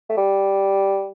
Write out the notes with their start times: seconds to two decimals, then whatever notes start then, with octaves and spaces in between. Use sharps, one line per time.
0.09 A3
0.17 G3